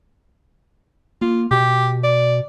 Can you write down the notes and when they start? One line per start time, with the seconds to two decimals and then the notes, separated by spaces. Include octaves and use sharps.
1.22 A#3 F4
1.51 B2 G4
2.03 D5